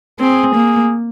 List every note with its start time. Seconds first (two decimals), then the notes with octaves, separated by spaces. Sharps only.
0.20 C4 G#4
0.55 A#3